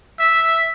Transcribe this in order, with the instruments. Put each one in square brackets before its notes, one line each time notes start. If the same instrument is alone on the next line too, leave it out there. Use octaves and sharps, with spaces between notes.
[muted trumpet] E5